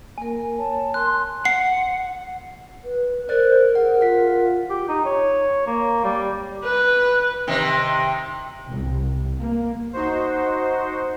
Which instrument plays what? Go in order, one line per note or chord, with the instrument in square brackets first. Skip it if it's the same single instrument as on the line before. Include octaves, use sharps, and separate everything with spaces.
[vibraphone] A#3 A#4 [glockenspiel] G#5
[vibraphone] C#5 [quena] A5
[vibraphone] A#4 A5 [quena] C6 [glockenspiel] F#6
[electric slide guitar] F#5 [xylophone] C7
[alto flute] B4
[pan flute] A#4 [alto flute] C5 [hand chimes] D5 F#6 A6
[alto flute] G#4 [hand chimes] F#5
[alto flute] F4 [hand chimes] F#5 B6
[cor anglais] G4
D#4
C#5
A#3
G3
[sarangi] B4
[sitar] C3 D#3
[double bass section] C2
A#3
[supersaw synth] D#4 F#4 C5